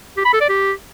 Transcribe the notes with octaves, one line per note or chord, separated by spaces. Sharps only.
G4
B5
A4
D5
G4